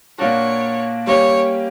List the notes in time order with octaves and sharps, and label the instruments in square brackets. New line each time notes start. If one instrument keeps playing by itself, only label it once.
[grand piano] A#2 A#3 D4 F#4 [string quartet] C#5
[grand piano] G3 A#3 C#4 G4 [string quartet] C#5